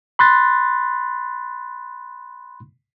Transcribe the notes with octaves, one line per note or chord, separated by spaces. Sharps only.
B5 C6 F#6 A6